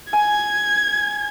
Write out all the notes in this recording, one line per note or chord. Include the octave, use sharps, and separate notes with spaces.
G#5 G#6